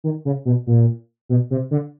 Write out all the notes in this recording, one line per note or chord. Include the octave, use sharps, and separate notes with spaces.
D#3
C#3
B2
A#2
B2
C3
D3